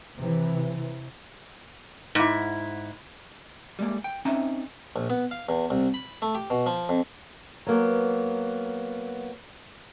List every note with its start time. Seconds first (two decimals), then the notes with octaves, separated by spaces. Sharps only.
0.18 C3 E3
2.15 G#2 E4
3.79 G3 G#3 A#3
4.04 G5
4.25 C4 C#4 D#4 E5 A#5
4.96 A#1
5.10 B3
5.31 F5
5.49 E2
5.70 C2
5.94 B5
6.22 A3
6.35 G4
6.50 B2
6.66 F3
6.89 F2
7.67 F#3 A#3 B3